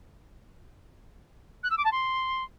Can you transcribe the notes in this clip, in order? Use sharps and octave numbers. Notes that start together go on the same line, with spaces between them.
F#6
E6
D6
A5
C6